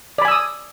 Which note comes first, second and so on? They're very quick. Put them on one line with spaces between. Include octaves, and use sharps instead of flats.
D5 B5 G#5 E6 D#6